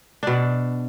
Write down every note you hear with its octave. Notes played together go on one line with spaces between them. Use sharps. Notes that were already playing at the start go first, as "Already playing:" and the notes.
B2 D4